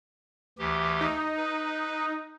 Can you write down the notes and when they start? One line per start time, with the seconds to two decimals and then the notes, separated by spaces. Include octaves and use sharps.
0.59 D2 E3 G4
1.01 D#4
1.37 B4